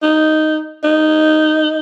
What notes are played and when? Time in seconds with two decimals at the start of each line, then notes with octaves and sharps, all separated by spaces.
0.02 D#4
0.84 D#4